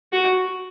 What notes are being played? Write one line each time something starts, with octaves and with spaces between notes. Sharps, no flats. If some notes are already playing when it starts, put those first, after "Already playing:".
F#4